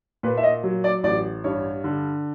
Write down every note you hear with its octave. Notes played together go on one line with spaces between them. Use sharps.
A#2 B4
E5
D#5
F#3
D5
A1 D5
G2 C#5
D3